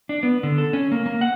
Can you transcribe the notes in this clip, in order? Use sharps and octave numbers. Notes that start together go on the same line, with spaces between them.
D4
B3
D3
A4
C#4
A#3
A#3
F#5